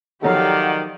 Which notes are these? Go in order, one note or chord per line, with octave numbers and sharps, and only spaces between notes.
D#3 F3 F#3 G4 A4 D5 F5 F#5